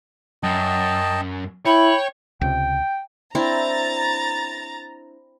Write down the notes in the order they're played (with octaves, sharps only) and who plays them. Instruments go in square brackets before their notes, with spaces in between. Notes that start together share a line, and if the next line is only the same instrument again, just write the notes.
[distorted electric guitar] F#2 [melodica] D#5 G5 A5
[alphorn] E4 [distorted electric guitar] C#5 [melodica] G5 [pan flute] B5
[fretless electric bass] C#2 C3 [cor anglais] G5
[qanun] C4 D4 E4 [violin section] A#5 A6